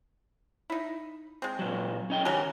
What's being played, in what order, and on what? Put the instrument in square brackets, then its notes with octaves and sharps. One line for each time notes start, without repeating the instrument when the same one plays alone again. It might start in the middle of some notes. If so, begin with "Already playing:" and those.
[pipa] D#4 E4
G#3 C4
[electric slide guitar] A#2 F#3
C#4 D#5 G5
[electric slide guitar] D#3 G#5 [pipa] F#3 G4 A#4